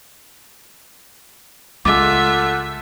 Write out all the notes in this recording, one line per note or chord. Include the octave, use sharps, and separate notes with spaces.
C#2 G#3 A3 F4 E5 F#5 D6